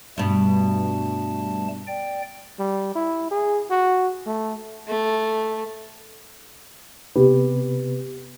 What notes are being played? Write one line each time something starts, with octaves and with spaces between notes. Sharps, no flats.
G2 B2 G3 A3 A5
D5 G5
G3
E4
G#4
F#4
A3
A3
C3 B3 G4 B4